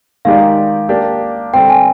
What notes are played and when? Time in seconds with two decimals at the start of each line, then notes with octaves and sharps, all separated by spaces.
0.25 D#3 G#3 D#4 G4 D5 F5
0.89 A#3 D4 G4
1.53 D3 G3 C4 G5
1.69 G#5